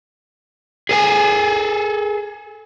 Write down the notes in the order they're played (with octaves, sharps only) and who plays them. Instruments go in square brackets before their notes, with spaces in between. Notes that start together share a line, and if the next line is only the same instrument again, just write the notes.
[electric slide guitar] G#4 A4 G#5